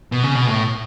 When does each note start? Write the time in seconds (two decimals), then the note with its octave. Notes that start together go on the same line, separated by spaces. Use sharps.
0.12 B2
0.23 C#3
0.35 B2
0.47 A2